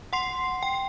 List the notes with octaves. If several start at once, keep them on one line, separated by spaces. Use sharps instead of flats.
F#5 C6 C7
G5